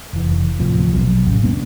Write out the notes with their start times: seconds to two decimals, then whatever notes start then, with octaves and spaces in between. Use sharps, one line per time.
0.13 F1 E3
0.59 D1 A2 C3 F3
0.93 A#1 B2 F#3
1.25 E1 A2 C#3
1.43 G3 A#3 B3 D4